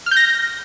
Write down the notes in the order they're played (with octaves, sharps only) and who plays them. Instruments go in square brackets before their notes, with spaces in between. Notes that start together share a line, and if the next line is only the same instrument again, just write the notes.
[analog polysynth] F6
G6
A#6